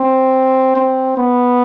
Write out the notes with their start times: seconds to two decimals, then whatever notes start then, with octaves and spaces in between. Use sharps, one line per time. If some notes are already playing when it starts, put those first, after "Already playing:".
Already playing: C4
0.75 C4
1.17 B3